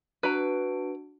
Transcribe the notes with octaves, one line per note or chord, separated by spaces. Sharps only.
D4 F#4 B4 A#5 D7